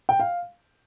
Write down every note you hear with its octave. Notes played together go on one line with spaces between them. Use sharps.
G5
F5